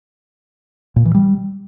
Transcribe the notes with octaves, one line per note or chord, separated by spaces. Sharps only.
A#2
E3
G3